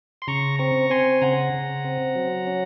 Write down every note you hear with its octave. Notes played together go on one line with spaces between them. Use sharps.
C6
C#3 A#5 C#6
C4 A#5 C#6
C4 G#5 C6
C#3 F#5 A#5
C#3
C4
F#3
C#4